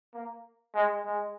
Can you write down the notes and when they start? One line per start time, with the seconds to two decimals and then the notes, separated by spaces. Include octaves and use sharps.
0.14 A#3
0.75 G#3
1.05 G#3